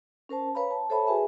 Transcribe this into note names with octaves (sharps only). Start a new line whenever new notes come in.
C#4 A#4 C5 A5
B4 C#5 F5 A#5 B5
A5
A4 C5 C#5 E5 A5 B5
F#4 G#4 B4 E5 G#5